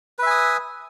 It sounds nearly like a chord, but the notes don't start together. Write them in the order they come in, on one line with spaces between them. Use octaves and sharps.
B4 E5 G#5 D#6